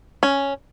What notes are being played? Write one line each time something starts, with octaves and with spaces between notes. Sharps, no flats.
C#4